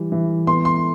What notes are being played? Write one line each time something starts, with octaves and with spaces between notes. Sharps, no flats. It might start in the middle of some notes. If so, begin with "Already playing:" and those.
Already playing: E3 G3
E3
B3 C6
C6